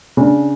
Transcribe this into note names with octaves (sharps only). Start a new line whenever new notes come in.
C#3 D4